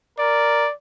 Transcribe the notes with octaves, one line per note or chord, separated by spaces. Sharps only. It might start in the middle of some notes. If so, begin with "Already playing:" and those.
A#4 D5